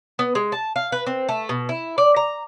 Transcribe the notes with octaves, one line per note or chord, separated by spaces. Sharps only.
B3
G#3
A5
F5
B4
C4
A3
B2
E4
D5
A#5